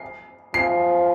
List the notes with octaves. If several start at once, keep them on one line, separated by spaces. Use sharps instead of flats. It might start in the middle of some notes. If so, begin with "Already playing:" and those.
Already playing: C7
F3 C7